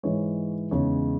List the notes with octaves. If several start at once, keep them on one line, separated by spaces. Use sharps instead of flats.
G#2 E3 G#3 C#5
E2 C#3 G#3 D#4 C#5